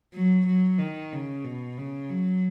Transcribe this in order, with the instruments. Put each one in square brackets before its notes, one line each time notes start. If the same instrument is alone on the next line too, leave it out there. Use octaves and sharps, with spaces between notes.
[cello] F#3
F#3
D#3
C#3
B2
C#3
F#3